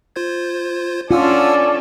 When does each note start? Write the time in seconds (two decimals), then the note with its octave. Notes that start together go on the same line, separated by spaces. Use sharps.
0.16 F4 C5 G#6
1.11 C#4 D4 F4 A4 D5 F#5 G#5 E6